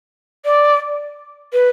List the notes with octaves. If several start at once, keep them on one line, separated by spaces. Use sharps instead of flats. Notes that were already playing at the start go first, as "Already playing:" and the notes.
D5
B4